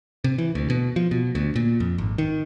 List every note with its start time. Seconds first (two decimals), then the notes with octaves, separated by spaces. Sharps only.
0.24 C3
0.38 E3
0.55 D2
0.70 B2
0.96 F3
1.11 B2
1.35 D2
1.56 A#2
1.80 F2
1.98 G#1
2.18 D#3